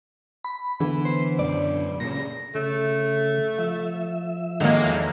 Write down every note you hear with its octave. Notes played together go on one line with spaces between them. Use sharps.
B5
D3 E3 B3
C5
F#2 B2 D5
A#2 C#3 A#6
C#3 A3
F3 E5
A2 D#3 F#3 G#3 A#3
E2